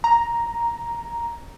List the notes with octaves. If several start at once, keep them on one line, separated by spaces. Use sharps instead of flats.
A#5